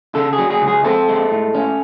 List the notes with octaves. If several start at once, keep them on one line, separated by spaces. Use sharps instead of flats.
C#3 A4
G#4
F#3
G#4
C#2
G#4
C4 A4
G#3
A2
C#4